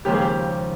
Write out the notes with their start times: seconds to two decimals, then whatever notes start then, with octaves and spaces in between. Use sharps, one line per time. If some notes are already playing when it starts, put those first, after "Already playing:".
0.05 D#2 C#3 F3 G#3 G4
0.13 G#4
0.21 G4